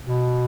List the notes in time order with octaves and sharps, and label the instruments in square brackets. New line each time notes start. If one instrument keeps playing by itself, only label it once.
[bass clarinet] B2